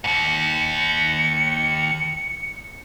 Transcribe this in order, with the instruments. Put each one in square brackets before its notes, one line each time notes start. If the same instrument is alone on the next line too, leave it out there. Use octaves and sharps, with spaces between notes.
[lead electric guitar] D#2 G#2 [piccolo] C#7